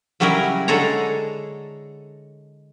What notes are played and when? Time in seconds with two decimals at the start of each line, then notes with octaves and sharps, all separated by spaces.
0.20 C#3 F#3 G3 C#4 E4 A#4
0.68 D3 G#3 G#4 A4 C#5 A#5